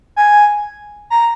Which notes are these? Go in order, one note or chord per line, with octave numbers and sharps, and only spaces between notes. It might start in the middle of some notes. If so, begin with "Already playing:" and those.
G#5
A#5